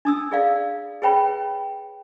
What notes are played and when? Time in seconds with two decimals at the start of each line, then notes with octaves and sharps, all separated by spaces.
0.05 D4 D#6 E6
0.32 G#4 D5 F5
1.02 G#4 B4 C#5 G5 B5